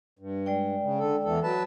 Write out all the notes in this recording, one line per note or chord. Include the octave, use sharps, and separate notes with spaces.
G2
G#3 D5 G5
C#3
D3 A4
E2 E3 A4
F#3 B4 A5